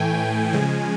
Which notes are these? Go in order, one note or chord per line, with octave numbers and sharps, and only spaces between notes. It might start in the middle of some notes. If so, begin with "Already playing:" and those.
Already playing: A2 E3 A3 G5 G#5
G5
C#3 F3 G#3 G#5